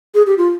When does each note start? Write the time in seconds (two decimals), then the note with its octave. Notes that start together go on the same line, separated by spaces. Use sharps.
0.15 G#4
0.27 G4
0.38 F4